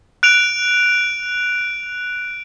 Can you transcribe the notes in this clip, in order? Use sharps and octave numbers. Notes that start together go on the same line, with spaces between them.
F#6 D7 F7